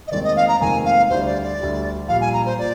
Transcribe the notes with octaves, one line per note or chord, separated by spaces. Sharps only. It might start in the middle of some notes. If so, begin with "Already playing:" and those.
D#5
F1 D#2 D#3 G#3 C4 D5
D#5
F5
A#5
F1 D#2 D#3 G#3 C4 G#5
F5
D2 D3 G3 D4 C5
D5
D5
D2 D3 G3 D4
A#1 A#2 G3 F5
G#5
A#5
C5
A#2 D5